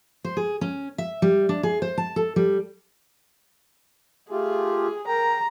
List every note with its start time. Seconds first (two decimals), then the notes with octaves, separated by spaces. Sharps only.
0.24 C5
0.37 G#4
0.61 C#4
0.98 E5
1.22 G3
1.49 D4
1.63 G#4
1.82 C5
1.98 A5
2.16 A4
2.36 G3
4.31 A3 F4 G4 G#4
5.08 A#4 G5 A#5